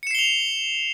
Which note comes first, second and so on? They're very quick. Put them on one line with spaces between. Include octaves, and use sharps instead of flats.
C#7 E7 C7 G7 F7